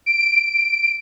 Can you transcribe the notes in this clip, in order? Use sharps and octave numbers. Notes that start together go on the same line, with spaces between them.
D7